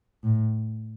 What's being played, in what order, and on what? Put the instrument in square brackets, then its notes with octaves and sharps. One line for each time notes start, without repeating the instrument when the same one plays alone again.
[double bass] A2